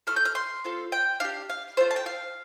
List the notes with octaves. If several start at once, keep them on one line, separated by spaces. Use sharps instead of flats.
A3 F4 A4 F6
G6
F6
C6
C4 F4 A4
G5
D4 G4 F5
F5
A3 D4 F4 C5
A5
G5
F5